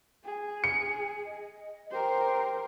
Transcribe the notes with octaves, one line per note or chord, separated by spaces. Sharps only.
G#4
C#7
D#5
G4 A#4 C5